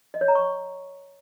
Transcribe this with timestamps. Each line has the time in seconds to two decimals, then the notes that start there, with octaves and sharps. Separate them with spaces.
0.14 D#5
0.21 C#5
0.28 A#5
0.35 C#6